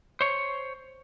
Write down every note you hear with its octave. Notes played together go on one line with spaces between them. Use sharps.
C5 C#5